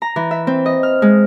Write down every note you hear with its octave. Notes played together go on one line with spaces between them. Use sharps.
A#5
E3
E5
C4
D#5
F6
G#3